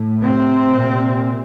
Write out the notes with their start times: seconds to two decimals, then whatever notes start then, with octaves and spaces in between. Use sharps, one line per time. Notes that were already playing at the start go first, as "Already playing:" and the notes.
Already playing: A2
0.22 C3 C4
0.74 A#2